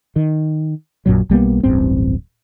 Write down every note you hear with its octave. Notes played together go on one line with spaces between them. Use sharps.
D#3
A#1 F#2 A#2 F#3
B1 G3 A#3 B3
D1 A1 G2 C4